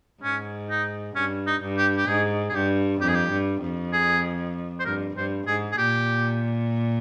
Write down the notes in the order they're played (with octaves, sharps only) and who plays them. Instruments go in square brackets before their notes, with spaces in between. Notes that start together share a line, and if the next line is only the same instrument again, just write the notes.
[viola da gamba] G#2 [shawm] C#4
[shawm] D#4
[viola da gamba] G2 [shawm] C#4
[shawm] D#4
[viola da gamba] G2
[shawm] G4
G4
[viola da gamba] G#2 [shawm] G#4
[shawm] G#4
[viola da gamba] G2 [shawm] G4
[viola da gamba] F2 [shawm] G4
[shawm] G#4
G4
[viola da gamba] G2
F2
[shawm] G#4
C5
[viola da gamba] G2 [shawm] A#4
[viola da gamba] G2 [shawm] C5
[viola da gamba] G#2 [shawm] G#4
[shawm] G#4
[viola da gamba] A#2 [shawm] G4